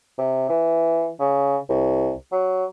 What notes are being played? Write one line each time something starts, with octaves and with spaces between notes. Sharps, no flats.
C3
E3
C#3
C2
F#3